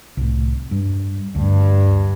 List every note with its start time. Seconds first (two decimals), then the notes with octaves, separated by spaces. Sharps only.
0.17 C2 A2
0.71 G2
1.35 D2 G2